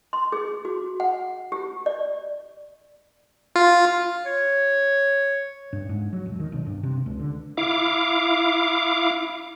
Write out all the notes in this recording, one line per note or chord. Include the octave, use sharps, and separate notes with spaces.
C6
G#4
F#4
F#5
G4
D5
F4
C#5
G2
G#2
F#3
E1
D#3
B1
G2
C3
C#2
D3
E4 F5 D6